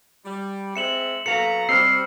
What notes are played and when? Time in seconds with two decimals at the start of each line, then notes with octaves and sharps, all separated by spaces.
0.25 G3
0.76 G#3 C4 E5 C#7 E7 F#7
1.26 B2 F#3 A4 B4 F5 A#5 C#7
1.69 G3 C4 G4 C5 D#5 E6 F6 C7